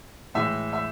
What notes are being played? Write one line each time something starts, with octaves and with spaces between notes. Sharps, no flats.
A2 E3 G#3 E5
E5